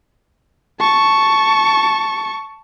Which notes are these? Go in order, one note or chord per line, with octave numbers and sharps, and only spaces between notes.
A5 C#6